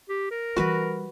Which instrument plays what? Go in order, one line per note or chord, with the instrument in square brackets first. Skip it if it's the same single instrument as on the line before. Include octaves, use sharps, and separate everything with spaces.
[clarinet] G4
A#4
[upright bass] E3 G3 [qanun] F#4 B4